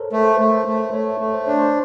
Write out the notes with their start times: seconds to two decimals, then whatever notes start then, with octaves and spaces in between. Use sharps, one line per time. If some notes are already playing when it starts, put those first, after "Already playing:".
Already playing: A4 A#4 C5 C#5
0.12 A3 B4
0.24 C5
0.35 B4
0.40 A3
0.67 A3
0.93 A3 C#5
1.20 A3
1.34 C5
1.47 D4 C#5
1.59 C5